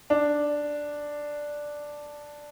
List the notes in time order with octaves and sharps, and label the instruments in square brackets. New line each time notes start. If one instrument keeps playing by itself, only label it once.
[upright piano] D4